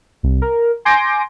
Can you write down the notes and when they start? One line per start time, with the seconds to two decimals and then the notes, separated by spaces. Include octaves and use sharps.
0.23 C2
0.42 A#4
0.85 G#5 C6 D6 G6 A#6 D7